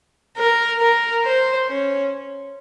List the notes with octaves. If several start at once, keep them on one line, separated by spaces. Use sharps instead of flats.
A#4
A#4
C5
C#4